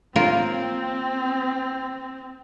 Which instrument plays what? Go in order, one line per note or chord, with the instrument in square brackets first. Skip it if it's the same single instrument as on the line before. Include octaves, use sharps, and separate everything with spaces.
[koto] A#3 F4 A#4 [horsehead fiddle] C4